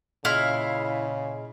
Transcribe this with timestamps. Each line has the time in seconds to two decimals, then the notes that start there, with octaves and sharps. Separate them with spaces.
0.25 A#2 C#3 E4 D#5 F5 C6